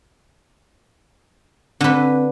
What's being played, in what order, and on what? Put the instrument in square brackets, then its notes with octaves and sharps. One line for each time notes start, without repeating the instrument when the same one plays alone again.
[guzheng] D3 B4 [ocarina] C4